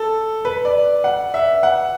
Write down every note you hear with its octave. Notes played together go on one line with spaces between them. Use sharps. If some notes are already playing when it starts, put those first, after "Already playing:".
Already playing: A4
B4
D5
F#5
E5
F#5